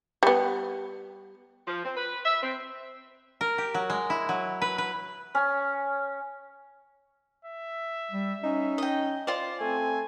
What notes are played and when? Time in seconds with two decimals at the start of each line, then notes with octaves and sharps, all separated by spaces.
0.23 G3 B3
1.68 F3
1.85 C4
1.97 B4
2.25 E5
2.43 C4
3.41 A#4
3.58 G4
3.74 F#3
3.90 G#3
4.10 E4
4.29 F#3
4.62 B4
4.78 B4
5.35 C#4
7.45 E5
8.12 G3
8.44 C#4 D#4
8.78 D#5 G5
9.27 F4 C5 D5
9.61 A3 C4 G#5